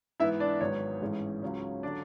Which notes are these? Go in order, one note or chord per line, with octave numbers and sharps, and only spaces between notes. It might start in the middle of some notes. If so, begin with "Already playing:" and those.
G#2 E3 B3 E4 E5
D4 D5
G#1 G#2 F#3 B3 C#5
A1 G#2 E3 G#3 C#4
C#2 C#3 F#3 C#4
D3 F#3 D4 D5